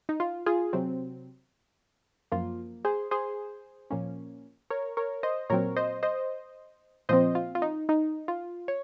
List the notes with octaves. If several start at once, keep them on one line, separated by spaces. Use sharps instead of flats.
D#4
F4
F4 G#4
C3 F#3 C4
F#2 F3 A#3 F4
G#4 C5
G#4 C5
A#2 F3 A#3 C#4
A#4 C#5
A#4 C#5
C5 D#5
A#2 F#3 C4 A#4 C#5
C5 D#5
C5 D#5
A#2 F3 C4 C5 D#5
F4
F4
D#4
D#4
F4
C#5